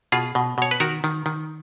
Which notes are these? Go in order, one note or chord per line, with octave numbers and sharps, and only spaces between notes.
B2 F4 G#4
B2
B2 C#5
B4
D#3 F#4 A#4
D#3
D#3